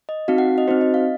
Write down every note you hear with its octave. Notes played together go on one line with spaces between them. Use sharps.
D#5
C4 D#4 F#4 F5
F#5
D#5
C4 D#4 F#4 C5
D#5
F5